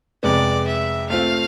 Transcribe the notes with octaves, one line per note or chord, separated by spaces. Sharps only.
F2 C3 G#3 B3 D5
E5
A3 C4 F4 F5